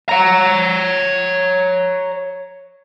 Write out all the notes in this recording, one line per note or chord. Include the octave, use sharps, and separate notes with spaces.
C#5 A#5